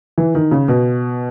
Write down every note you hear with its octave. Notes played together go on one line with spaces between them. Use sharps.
E3
D#3
C#3
B2